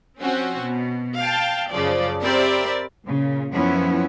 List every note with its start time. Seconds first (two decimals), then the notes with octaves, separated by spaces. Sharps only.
0.21 F3 C4 C#4 F#4
0.61 B2
1.19 F5 G5 A5
1.72 F#2 C#3 F3 D5
2.23 C4 G4 A#4 D5 E5 B5
3.06 A#2 C#3
3.52 F#2 F3 B3 C#4 E4